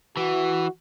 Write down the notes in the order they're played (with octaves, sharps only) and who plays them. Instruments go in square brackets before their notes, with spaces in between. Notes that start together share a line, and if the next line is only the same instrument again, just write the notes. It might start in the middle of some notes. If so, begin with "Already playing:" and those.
[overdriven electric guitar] E3 [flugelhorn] F#4